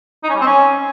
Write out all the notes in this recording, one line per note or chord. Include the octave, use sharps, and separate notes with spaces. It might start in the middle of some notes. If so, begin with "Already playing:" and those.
D#4
C#4
G3
C4
C#4